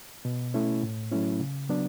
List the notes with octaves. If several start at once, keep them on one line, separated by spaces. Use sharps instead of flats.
B2
A3 C#4 E4
A2
F#3 A3 C#4 E4
C#3
F#3 B3 D4